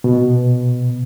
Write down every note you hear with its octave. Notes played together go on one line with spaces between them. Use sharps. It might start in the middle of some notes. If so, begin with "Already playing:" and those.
B2